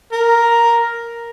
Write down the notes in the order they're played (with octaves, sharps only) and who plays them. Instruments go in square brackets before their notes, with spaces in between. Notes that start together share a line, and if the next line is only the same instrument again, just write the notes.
[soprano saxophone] A#4